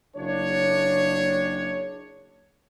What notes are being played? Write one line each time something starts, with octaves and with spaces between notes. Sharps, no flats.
F#1 D4 C#5